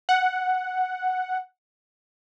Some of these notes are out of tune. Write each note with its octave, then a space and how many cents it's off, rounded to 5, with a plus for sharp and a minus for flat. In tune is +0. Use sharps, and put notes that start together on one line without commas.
F#5 +0